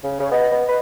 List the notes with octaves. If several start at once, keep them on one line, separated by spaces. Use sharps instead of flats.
C#3
C#3 C#5
B3 D#5
B3
B4 D#5